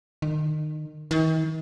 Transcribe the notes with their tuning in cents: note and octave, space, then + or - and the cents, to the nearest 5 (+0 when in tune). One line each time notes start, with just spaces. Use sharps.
D#3 -25
D#3 +45